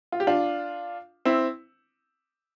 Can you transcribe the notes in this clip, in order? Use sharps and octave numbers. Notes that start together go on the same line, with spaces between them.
F4
G4
D4 F4
C4 E4